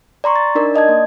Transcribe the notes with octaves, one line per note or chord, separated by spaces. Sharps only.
D5 A#5 C6 C#6
A6
D4 D#4 A#4 D5
D5 D#5 A5 G#6
A#3